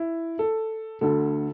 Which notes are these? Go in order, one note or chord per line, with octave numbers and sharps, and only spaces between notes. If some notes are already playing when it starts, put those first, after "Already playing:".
Already playing: E4
A4
D2 D3 A4